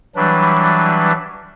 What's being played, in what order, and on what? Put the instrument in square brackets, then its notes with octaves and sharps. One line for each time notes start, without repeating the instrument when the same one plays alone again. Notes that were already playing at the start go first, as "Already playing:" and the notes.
[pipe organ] E3 F#3 G3 D4 B4